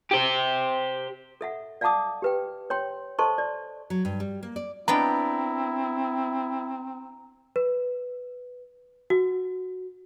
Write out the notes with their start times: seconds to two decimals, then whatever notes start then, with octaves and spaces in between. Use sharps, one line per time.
0.11 G4 C5
1.41 A4 E5 F#5
1.81 D5 F5 F#5 A5 D6 D#6
2.22 G4 B4 G5
2.70 C#5 G5 C6
3.19 A4 C5 D#5 A5 C6 C#6
3.38 D5
3.90 F#3
4.05 G2
4.20 G3
4.43 A#3
4.56 D5
4.88 B3 C4 D4 E4 G5 A#5
7.56 B4
9.10 F#4